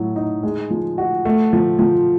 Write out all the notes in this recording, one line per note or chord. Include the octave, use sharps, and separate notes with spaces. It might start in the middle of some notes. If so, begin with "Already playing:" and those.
Already playing: A2 F#3
D#4
G#3
F3
F#4
A3
F3
F3